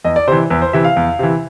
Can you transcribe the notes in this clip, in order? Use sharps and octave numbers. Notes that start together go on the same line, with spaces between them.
E2 D#5
D5
C3 E3 C5
E2 B4
C5
C3 E3 E5
F5
E2
C3 E3